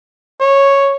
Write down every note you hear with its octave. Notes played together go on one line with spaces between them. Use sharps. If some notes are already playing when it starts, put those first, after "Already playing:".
C#5